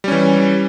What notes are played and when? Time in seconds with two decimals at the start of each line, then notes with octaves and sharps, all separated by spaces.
0.04 G3
0.08 C#4
0.12 E3